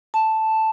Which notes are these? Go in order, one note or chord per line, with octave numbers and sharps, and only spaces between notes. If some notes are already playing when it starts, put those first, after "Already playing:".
A5